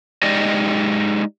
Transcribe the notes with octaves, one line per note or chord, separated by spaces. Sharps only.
G#3 D#4 G4 D5 D#5